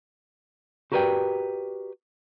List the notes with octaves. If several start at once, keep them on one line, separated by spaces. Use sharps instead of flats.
F#4 G4 A#4 B4 D5 G5